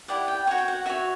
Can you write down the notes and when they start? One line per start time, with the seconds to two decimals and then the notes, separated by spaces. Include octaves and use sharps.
0.08 E4 G4 D5 F#5
0.28 G5
0.47 F#4 C#5 F#5
0.58 G5
0.68 F#5
0.86 F#4 C#5 E5